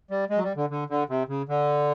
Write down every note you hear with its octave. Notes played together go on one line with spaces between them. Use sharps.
G3
G#3
F#3
G3
D3
D3
D3
C3
C#3
D3